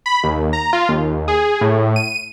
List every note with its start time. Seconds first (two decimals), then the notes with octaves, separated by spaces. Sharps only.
0.06 B5
0.23 D#2
0.53 A#5
0.73 F4
0.89 D#2
1.28 G#4
1.61 A2
1.96 D#7